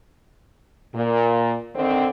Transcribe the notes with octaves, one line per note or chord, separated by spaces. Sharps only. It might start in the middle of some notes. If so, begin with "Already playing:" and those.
A#2
D3 D#3 C4